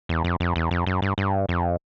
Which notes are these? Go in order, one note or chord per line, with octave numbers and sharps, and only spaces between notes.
E2
F2
F2
E2
F2
F#2
G2
G2
F2